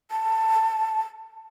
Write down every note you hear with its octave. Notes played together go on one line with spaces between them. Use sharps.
A5